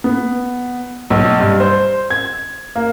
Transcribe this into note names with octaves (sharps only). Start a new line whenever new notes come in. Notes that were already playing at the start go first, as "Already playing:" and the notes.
B3
B1
G2
C5
G#6
A#3